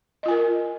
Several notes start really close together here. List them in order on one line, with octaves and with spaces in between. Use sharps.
D#5 F4 G#5 A#4